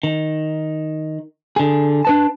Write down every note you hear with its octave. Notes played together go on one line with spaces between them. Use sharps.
D#3
D3 G#4
D4 B4 A5